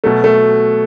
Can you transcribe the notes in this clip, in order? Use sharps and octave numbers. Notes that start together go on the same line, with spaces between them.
B2 F#3 A3
A3